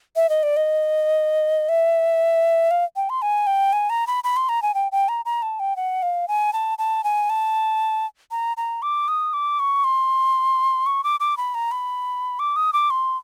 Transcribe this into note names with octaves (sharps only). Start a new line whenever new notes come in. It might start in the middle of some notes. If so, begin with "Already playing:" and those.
E5
D#5
D5
D#5
E5
F5
G5
C6
G#5
G5
G#5
A#5
B5
B5
C6
A#5
G#5
G5
G5
A#5
A#5
A5
G5
F#5
F5
G#5
A5
A5
G#5
A5
A#5
A#5
D6
D#6
D6
C#6
C6
C#6
D6
D6
B5
A#5
B5
D6
D#6
D6
C6